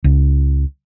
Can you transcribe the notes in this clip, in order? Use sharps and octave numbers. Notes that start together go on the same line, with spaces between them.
C#2